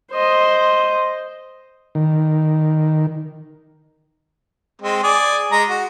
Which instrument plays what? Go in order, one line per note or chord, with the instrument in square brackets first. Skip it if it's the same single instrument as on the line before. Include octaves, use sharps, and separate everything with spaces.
[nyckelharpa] C5 D#5
[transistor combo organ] D#3
[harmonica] G#3 C4
G#4 D5
G#3 A#5
F#4